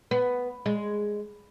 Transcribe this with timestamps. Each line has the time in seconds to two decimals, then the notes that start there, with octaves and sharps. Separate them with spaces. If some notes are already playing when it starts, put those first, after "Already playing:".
0.11 B3
0.66 G#3